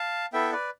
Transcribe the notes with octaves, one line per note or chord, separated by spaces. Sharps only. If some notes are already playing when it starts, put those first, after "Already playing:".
Already playing: F5 A5
B3 E4 A4 E5 G5
B4 D5